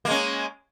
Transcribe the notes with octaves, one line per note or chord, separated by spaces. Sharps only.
G#3 A#3 C#4